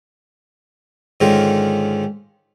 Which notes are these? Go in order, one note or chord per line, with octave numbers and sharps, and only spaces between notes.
G#2 D3 D#3 G#3 C#4 F4